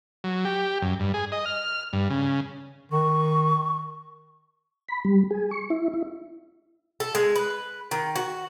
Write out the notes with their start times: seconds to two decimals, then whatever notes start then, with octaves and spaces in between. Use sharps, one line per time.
0.24 F#3
0.45 G4
0.82 F#2
1.00 G2
1.14 G#4
1.32 D#5
1.46 F6
1.93 G2
2.10 C#3
2.92 D#3 C#6
4.89 B5
5.05 G3
5.31 G#4
5.51 C#6
5.70 E4
5.94 E4
7.00 A4
7.15 G#3
7.36 B4
7.91 D#3
8.16 F#4